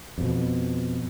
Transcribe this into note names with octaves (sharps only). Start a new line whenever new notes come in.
F2 B2